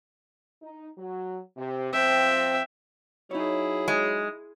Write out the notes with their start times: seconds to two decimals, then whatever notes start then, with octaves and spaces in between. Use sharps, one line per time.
0.62 D#4
0.97 F#3
1.56 C3
1.93 F3 C4 E5 G5
3.31 F#3 D#4 E4 G#4 C#5
3.88 G#3